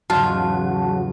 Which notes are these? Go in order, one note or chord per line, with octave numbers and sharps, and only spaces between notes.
E2 G#2 C#3 F#3 F4 F#4 A5